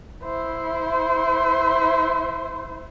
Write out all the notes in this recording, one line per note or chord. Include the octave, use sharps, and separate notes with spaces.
E4 C5